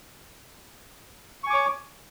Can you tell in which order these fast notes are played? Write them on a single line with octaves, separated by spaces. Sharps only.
C#6 G#5 D6 C#5